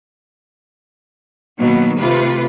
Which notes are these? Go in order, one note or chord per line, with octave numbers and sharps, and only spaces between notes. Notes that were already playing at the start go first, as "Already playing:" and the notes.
B2 D#3 F#3 A#3 B3
C3 A3 F4 B4